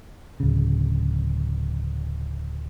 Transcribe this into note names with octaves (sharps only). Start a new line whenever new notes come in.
D1 C#3